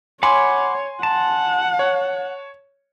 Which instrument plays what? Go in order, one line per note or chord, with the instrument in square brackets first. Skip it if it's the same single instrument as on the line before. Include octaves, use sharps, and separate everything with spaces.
[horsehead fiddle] C#5 [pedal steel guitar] F#5 B5 D6 [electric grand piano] G#5 C6
[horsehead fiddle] F#5 [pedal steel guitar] A5
[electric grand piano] C#5